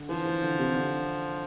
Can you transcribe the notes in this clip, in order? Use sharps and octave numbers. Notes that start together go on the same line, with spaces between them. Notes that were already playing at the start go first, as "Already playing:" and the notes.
Already playing: D3
E3 F3
E3
D3
C3
D3